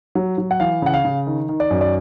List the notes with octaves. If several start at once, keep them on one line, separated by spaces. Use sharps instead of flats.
F#3
F#3
F#5
E3 F5
C#3 F#5
F5
C#3
D#3
D#3
D5
F#2
D5